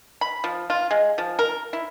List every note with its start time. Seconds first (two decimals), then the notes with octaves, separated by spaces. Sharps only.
0.21 B5
0.44 F3
0.70 F4
0.91 G#3
1.18 F3
1.39 A#4
1.73 E4